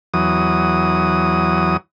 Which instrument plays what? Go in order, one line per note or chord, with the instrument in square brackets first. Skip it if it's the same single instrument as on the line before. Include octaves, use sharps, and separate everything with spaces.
[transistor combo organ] E2 F#3 D#6